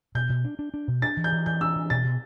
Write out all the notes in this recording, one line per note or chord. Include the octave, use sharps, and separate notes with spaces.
B2 G6
B2
D4
D4
D4
B2
D4 A6
E3
G6
E3
E3 G6
D4 E6
E3
B2 A6
B2